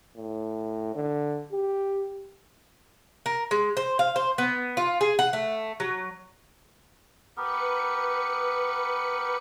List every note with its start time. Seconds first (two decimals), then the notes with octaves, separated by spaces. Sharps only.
0.17 A2
0.95 D3
1.52 G4
3.26 A#4
3.51 G#3
3.77 C5
3.99 F5
4.16 C5
4.38 B3
4.77 F4
5.01 G#4
5.19 F#5
5.33 A3
5.80 F#3
7.37 B3 G4 A#4 B4 C#7